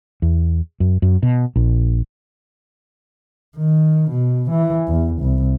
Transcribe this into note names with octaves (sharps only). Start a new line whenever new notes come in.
E2
F#2
F#2
B2
A#1
D#3
B2
E3
E2
C2